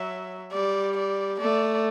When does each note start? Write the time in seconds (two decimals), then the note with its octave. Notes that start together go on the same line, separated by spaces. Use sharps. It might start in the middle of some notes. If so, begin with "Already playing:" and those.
Already playing: F#3 E5
0.52 G3 D5
0.97 D5
1.40 A3 D5